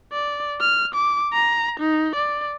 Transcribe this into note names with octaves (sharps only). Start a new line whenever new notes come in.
D5
F6
D6
A#5
D#4
D5